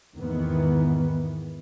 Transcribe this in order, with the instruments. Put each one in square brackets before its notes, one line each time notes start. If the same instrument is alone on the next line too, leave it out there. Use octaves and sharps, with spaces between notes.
[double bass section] E2 G#2 D#3 E3 B3